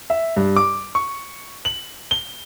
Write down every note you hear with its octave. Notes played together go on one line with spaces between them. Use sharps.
E5
G2
D6
C#6
F#7
G7